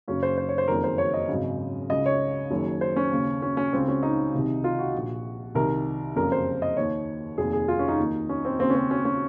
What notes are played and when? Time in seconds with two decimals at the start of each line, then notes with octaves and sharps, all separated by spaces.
0.08 F#1 F#2 C#3 C#4
0.23 C5
0.38 C5
0.49 C#5
0.58 C5
0.68 F#1 F2 D#3 A#4
0.84 C5
0.98 C#5
1.14 D#5
1.29 G#1 F#2 C#3
1.90 C#2 C#3 D#5
2.06 C#5
2.51 F#1 F#2 D#3
2.81 C5
2.96 C#4
3.12 D#2 C#3
3.42 C#4
3.57 C#4
3.73 C#2 C#3 C4
3.88 C#4
4.03 D#4
4.33 C2 C3 D#3
4.64 F4
4.79 F#4
4.95 A#1 A#2
5.55 C2 C3 D#3 A#4
6.16 F#1 F2 C#3 A#4
6.32 C5
6.62 D#5
6.77 D#2 D#3 C#5
7.38 F1 D#2 D#3 G#4
7.53 G#4
7.68 F4
7.79 C#4
7.88 D#4
7.99 D#2 D#3
8.29 C#4
8.45 C4
8.60 D#2 C#3 C4
8.70 C#4
8.75 C4
8.91 C#4
9.05 C#4